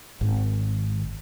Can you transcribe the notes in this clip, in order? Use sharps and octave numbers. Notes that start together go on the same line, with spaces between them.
G#1